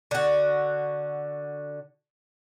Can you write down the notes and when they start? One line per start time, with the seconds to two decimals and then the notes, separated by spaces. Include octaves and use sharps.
0.11 D3 F#4